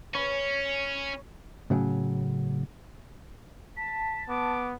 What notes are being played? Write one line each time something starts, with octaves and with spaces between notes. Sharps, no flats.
C#4 C#5 B5
A2 C#3 F#3
A5 B6
B3 D6